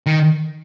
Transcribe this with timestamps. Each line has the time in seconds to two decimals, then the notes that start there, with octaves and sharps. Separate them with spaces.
0.06 D#3